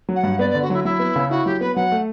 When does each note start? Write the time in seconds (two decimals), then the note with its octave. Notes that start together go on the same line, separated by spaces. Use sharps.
0.09 F#3
0.16 F#5
0.23 G2
0.39 B3 D5
0.50 D3 D5
0.62 F#4
0.70 F#3 E4
0.84 F#3 E4
0.99 B3
1.16 C#3
1.30 E4 F#4
1.46 F#3 G4
1.60 B3 B4
1.76 F#3 F#5
1.92 A3